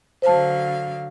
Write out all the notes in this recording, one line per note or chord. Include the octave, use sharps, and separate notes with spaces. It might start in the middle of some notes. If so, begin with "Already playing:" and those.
D3 F#3 C5 F5 A5